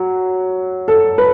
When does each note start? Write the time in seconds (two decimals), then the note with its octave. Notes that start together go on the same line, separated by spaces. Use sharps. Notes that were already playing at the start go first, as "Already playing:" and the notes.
Already playing: F#3
0.88 A4
1.18 B4